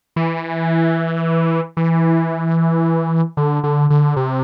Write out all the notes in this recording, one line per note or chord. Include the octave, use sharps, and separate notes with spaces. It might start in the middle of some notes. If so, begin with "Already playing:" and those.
E3
E3
D3
D3
D3
C3